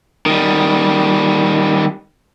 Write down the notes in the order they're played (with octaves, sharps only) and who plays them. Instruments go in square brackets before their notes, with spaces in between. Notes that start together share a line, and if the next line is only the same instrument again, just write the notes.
[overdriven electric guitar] D#3 G3